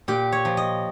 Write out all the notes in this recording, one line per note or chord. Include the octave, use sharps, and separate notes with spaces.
A#2 G4
C#5
F3
D#5